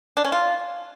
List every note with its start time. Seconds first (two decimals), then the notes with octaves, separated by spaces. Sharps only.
0.17 D4
0.25 C#4
0.32 F4